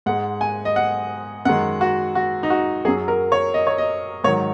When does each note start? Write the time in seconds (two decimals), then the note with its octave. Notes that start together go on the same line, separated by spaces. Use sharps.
0.06 G#2 G#3 F#5
0.41 G#5
0.65 D#5
0.76 F#5
1.45 F#2 D#3 G#3 F#5
1.81 F#4
2.15 F#4
2.43 D#4
2.50 F#4
2.85 F#3 G#4
2.88 F#2
3.08 A#4
3.32 C#5
3.54 D#5
3.67 C#5
3.78 D#5
4.24 G#2 D#3 F#3 C#5